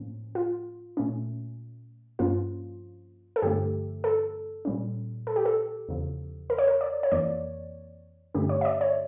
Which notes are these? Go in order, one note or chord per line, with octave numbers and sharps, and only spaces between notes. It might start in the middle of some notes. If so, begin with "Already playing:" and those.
Already playing: A2 F3 A#3 C#4
F4
A#2 A3 C#4
G2 F3 A#3 C#4 F4
A4
G2 D3 F3 A3 G4
A4
A#2 G3 C#4
A4
G4
A4
E2 C#3 F3
A#4
C#5
A#4
D5
C#5
F2 E3 A#3 D5
G2 D3 A3 C#4 G4
C#5
E5
D5
C#5